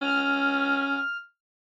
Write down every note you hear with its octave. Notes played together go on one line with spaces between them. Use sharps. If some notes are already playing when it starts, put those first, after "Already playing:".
C#4 F6